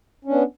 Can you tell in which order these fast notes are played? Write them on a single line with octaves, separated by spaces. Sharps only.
C#4 D4 B3